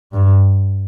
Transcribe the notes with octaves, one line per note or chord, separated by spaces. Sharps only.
G2